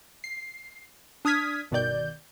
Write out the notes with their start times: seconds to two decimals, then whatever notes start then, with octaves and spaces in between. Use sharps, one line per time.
0.24 C7
1.25 D4 D#6 F6 G#6 B6
1.71 G1 B2 D#3 D5 G6